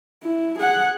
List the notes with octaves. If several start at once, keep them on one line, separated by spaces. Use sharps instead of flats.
E4
G#4 F#5